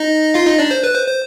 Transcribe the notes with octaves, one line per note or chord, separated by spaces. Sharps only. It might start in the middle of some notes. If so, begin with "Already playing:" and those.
Already playing: D#4 D#5
F4 F5
D#4 D#5
D4 D5
C5
B4
C5
C5